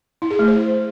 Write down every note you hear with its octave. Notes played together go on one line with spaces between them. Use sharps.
E4
G#4
A3
C5